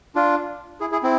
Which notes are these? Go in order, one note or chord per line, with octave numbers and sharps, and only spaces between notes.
D4 F4
E4 G#4
E4 G#4
C4 E4